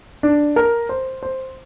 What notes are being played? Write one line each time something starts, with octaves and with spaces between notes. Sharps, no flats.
D4
A#4
C5
C5